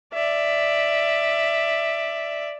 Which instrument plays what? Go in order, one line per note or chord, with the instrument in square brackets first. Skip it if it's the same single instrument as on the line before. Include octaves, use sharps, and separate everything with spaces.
[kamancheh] D5 E5